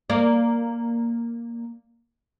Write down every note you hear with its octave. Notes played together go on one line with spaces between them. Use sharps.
A#3 D5